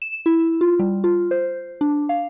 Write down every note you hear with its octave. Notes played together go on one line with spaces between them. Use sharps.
E7
E4
F4
G3
F4
C5
D4
F5